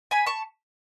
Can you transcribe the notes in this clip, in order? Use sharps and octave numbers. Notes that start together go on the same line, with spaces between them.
G#5 B5
A5 C#6